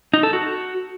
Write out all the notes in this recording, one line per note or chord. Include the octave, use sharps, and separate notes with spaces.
D#4
A4
F#4